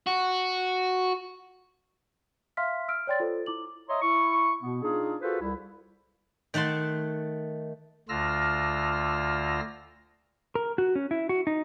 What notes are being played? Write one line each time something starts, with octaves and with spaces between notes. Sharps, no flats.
F#4
E5 F5 C6 F6 B6
E6 F6 D7
C#5 D5 G5 C6 A6
F4 A4 C5
E4 D6 F#7
C#5 D#5 E5 A#5 C6 D#6
E4 C#6
B2 B3
D4 D#4 F4 G#4
F4 F#4 G#4 A4 B4 C5
C2 E4
D#3 A3 F#5 A5 C6
D2 D3 F4 E6 F6 A#6
A#4
F#4
C#4
E4
F#4
D#4